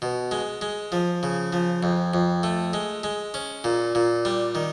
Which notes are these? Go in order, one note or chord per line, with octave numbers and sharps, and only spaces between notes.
B2
G#3
G#3
F3
C#3
F3
F2
F2
A3
G#3
G#3
C#4
A#2
A#2
G3
D#3